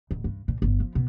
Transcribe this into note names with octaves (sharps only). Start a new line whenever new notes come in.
D1
G2
A#2
G1
F3
B2